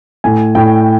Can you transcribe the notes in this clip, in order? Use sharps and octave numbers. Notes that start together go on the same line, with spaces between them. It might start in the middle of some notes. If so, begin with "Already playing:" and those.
A2 G#5
A2 G5